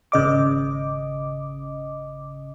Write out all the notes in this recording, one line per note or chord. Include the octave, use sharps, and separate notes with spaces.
G#1 C#3 D#5 D6